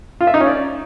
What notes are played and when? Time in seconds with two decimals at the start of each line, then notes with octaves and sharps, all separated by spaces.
0.21 F4
0.27 E5
0.34 D#4
0.41 C#4
0.47 D5